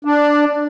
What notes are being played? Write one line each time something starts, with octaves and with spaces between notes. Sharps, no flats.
D4